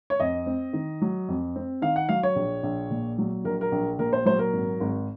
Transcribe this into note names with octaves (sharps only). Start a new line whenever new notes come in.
C#5
F2 D#5
C4
D#3
F#3
F2
C4
D#3 F5
F#5
F#3 F5
C#5
A#1
A#1
A#2
F#3
A#1 A#4
A#4
A#1
A#2 A#4
C5
F#3 C5
A#4
G#1
G#1